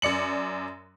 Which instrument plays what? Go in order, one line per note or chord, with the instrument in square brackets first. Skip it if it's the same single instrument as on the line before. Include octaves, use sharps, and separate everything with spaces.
[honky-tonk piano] F#2 D5 C#7 F#7